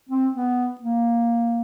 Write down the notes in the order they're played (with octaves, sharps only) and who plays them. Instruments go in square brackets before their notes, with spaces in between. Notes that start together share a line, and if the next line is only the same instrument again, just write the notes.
[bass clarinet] C4
B3
A#3